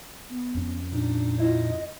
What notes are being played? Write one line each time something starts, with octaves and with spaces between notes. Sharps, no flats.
B3
F2 C#4
A#2 D4 D#4
E4 F4 D#5